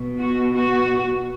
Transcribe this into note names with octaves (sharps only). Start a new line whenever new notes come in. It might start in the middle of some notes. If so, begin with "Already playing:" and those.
Already playing: B2
F#4
F#4